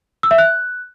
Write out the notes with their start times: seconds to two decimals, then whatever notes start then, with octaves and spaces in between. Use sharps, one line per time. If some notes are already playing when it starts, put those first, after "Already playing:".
0.23 E6
0.31 E5
0.38 F#6